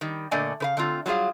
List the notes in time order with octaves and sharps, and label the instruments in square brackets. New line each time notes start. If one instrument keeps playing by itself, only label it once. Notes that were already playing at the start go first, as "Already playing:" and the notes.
[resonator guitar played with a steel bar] D#3 G3
A#2 D3 A3 D5 D#5 G#5
C#3 B4 F5
D3 A3 C4 F4
F#3 G3 F4 G#4 F5